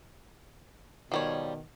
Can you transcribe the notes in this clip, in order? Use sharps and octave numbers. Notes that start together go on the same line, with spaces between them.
B2 D#3 F3 G3 C#5